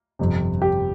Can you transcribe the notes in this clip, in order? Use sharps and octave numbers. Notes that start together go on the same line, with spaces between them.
G1 F2 C3
G4